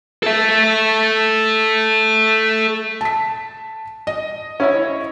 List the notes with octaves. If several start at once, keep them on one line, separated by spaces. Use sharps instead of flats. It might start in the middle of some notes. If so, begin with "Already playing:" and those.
A4 E5
A5 B6
D#5
C#4 E4 C#5